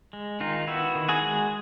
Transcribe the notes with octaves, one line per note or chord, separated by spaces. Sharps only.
G#3
D#3 D#4 F4
B3 E4 F#4
D#3
F#4 G#4
G#3